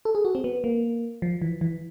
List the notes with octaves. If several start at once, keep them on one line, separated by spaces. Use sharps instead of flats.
A4
G#4
F#4
C4
B3
A#3
F3
E3
E3